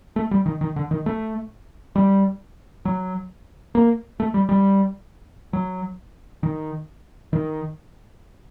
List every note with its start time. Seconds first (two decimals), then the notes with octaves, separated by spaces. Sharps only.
0.16 A3
0.31 G3
0.46 D#3
0.61 D#3
0.76 D3
0.91 D#3
1.06 A3
1.96 G3
2.85 F#3
3.75 A#3
4.20 A3
4.34 G3
4.49 G3
5.53 F#3
6.43 D#3
7.33 D#3